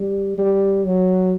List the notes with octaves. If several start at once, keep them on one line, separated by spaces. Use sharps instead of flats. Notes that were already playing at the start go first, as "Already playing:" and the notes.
Already playing: G3
G3
F#3